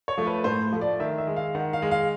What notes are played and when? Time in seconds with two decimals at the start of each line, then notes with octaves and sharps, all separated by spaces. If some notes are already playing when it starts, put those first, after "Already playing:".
0.08 C#5
0.17 F3 A3
0.27 B4
0.44 A2 C5
0.72 F3 A3
0.81 D5
1.00 D#3 E5
1.18 E5
1.27 G#3
1.36 F5
1.55 D#3 F#5
1.73 F5
1.82 G#3
1.91 F5